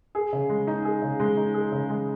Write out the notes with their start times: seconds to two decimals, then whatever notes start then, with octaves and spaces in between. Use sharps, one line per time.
0.15 G#4
0.33 C#3
0.49 G#3
0.67 D#4
0.85 G#4
1.02 C#3
1.20 G#3
1.37 D#4
1.54 G#4
1.72 C#3
1.90 G#3